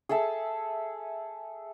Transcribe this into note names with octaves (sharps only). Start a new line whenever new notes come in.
G#4 A4 E5 A5